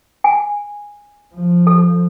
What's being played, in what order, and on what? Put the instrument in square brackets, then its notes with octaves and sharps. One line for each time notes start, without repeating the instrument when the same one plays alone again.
[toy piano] G#5
[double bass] F3
[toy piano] A4